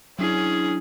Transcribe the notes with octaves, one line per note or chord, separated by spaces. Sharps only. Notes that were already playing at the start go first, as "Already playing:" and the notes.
F#3 C#4 D4 E4 G#4